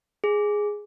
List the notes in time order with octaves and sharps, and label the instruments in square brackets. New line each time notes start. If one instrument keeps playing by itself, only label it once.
[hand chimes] G#4